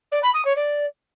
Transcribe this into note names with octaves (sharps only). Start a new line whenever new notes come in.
D5
B5
D#6
C#5
D5